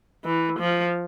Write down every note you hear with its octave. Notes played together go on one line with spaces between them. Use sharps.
E3
F3